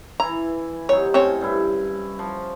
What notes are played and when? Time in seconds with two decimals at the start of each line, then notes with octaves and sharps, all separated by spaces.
0.20 E3 E4 A#5
0.89 C3 F#3 D#4 C#5
1.14 A2 C4 C#4 C#5
1.41 G2 E4
2.19 F3